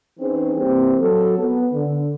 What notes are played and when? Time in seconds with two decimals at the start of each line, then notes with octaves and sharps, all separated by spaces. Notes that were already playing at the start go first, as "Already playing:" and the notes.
0.20 E3 C4 C#4 D#4 G#4 C5
0.57 E3 G3 A#3 C4
1.00 F#3 A4
1.38 B3
1.73 D3